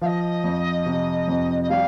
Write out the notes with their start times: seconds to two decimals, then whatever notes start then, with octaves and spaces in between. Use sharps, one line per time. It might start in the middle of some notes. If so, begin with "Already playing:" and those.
0.01 F3 F5
0.06 D#5
0.44 F2
0.86 C3
1.28 F2
1.62 D#5
1.69 G3 F5